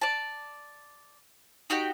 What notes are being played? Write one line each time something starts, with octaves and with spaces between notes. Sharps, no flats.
D5 A5
D#4 F#4 G4 G5